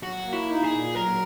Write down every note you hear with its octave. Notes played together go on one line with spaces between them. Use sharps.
F#3 F#4
A#3
E4
D#4
G#4
A#2
F#3 A#4